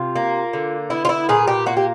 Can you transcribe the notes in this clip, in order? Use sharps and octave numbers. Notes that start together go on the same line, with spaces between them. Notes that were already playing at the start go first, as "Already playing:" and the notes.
Already playing: C3 F4
A#3
D3
B3 E4
F4
E4
A#2 G#4
G4
A#3 F#4
G4